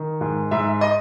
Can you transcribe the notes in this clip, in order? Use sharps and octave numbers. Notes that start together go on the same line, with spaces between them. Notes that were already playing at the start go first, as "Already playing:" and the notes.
Already playing: D#3
G#2
G#2 E5
D#5